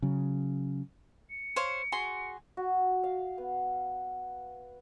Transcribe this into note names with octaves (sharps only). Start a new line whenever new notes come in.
C#3 F#3
C#7
C5 C#5 F5
F#4 G#4 C6
F#4
F5
B3